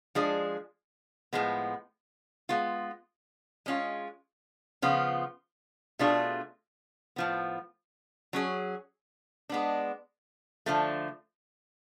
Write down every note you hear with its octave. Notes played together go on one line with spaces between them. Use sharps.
F3 G#3 D4 G#4
A2 F3 G#3 B3
G#3 B3 F4
G#3 C#4 F4
C#3 F3 B3 F4
B2 A3 D4 F4 G#4
A2 F3 B3
F#3 C#4 G#4
G#3 B3 D4
D3 F3 A3